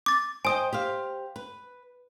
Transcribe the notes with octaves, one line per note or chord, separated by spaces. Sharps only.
D6 A6
C5 D#5 G5 G#5 D#6
G4 C5 F5
B4